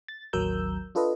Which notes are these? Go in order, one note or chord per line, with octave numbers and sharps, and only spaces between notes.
A6
A1 D#2 F#3 A#4 E6 G6
D4 F4 A4 B4 D#5